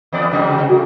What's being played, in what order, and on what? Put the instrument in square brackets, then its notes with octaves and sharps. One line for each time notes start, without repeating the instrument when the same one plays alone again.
[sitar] E2 B3 D5
G#2 C3 F#3
[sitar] A3 [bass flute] F#4